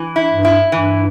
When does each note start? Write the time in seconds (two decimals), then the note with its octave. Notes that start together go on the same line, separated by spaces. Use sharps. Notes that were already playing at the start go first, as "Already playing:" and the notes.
Already playing: E3
0.16 E4
0.31 G2
0.45 E4
0.72 G2 E3